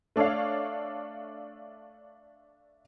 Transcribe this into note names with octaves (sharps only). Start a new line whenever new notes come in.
A3 D4 A4 C#5 F5